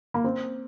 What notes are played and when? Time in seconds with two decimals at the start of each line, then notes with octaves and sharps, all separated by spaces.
0.14 A#3
0.24 C4